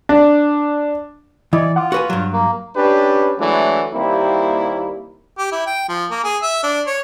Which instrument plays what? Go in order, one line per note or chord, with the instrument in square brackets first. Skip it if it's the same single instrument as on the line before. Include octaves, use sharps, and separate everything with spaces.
[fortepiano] D4
[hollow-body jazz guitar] E3 [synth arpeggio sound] E4 D#5 [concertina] D5
[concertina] F4 [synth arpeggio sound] F#5 D6
[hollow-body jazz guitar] F#4 B4 G#5
G2 F#3
[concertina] A#3
[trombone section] C#4 D4 G4 B4
E3 F#3 G#3 A3 D4 E4
D#2 G3 A#3 C4 E4
[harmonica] G4
E4
G5
F3
A#3
G#4
E5
D4
C#5